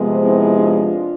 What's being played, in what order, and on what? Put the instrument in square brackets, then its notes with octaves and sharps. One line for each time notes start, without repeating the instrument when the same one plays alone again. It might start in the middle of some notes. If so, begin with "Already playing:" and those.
Already playing: [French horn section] C3 F3 G#3 B3
C4 E4
D4 F4